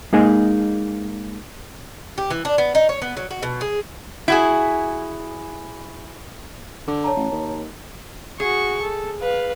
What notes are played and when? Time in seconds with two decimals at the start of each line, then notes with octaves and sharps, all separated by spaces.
0.13 G#3 A#3 D#4 G#4 D#5 G#5
2.18 G4
2.30 E3
2.45 D4
2.58 B3
2.75 D#4
2.89 C#5
3.02 B3
3.17 F#3
3.31 F#4
3.43 B2
3.61 G#4
4.28 E4 F#4 G#4
6.87 D3
7.04 C#5 A5 A#5
7.16 A1
7.32 D#2
8.40 F#4 G#4 C#6
8.82 A4
9.20 B4 F5